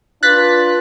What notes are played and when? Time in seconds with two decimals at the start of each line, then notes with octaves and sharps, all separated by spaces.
0.23 D4 F4 B4 F#6 A6 B6